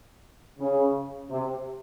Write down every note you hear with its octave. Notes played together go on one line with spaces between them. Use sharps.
C#3
C3